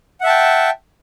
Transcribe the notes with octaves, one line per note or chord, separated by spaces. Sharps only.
E5 F#5 G5 A5